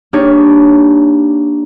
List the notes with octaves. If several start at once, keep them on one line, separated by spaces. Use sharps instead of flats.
A#3 D4 D#4 G4 C#5